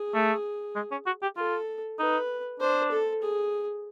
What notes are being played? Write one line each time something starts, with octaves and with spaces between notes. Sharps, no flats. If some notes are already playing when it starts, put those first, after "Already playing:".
Already playing: G#4
A3
G#3
C#4
F#4
G4
F4 A4
D#4 B4
D4 C5
A4
G#4